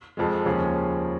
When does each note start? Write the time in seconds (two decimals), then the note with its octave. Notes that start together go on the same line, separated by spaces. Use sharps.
0.17 F2 F3 G#3
0.45 D#2 C#3 F3 C#4 G#4